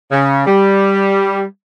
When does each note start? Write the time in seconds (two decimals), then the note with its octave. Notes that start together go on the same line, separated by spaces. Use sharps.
0.11 C#3
0.47 G3